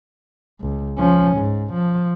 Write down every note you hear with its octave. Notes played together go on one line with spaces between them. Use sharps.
C#2
F3 C#4
G#2
F3